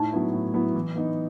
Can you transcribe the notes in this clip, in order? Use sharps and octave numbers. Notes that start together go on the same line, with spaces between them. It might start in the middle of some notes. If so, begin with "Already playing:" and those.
Already playing: A2 D#4
F#3 B3 E4
A2
F#3 B3 E4
E3
B3 D#4